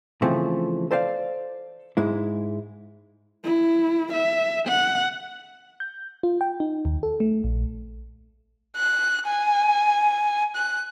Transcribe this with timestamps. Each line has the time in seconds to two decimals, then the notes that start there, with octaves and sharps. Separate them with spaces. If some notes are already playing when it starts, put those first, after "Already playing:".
0.22 C#3 E3 F3 A3 C4
0.91 A4 C5 D5 F5
1.97 G#2 G#3 E4
3.44 E4
4.13 E5
4.67 F#5
5.80 G6
6.23 F4
6.41 G5
6.60 D#4
6.85 D#2
7.03 A4
7.20 A3
7.44 A#1
8.77 F#6
9.27 G#5
10.55 F#6